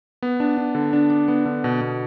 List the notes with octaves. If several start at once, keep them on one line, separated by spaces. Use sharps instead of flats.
B3
D4
D4
D3
D4
D4
B3
D3
B2
B2